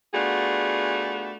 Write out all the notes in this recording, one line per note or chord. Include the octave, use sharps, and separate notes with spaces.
A3 B3 D4 F4 F#4 G#4